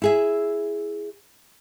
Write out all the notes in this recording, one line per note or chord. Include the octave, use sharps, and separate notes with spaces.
E4 G#4 E5